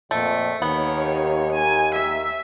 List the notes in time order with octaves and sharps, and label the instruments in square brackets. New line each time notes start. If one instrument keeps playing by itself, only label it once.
[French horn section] F2 A#2 [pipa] A3
[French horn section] D#2 [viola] D#3 C#5 [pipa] B3
[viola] G#5
E5